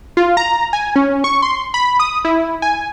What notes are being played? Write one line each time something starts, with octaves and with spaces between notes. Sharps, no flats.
F4
A#5
G#5
C#4
C#6
C6
B5
D#6
E4
G#5